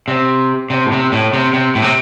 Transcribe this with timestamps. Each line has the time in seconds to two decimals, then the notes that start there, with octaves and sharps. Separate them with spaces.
0.08 C3
0.70 C3
0.86 A2
0.92 C3
1.12 A2
1.33 C3
1.53 C3
1.75 A2
1.82 C3